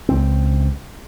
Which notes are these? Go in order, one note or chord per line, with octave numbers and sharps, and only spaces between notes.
C#2 C4